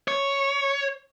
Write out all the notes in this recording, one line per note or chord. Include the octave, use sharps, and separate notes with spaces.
C#5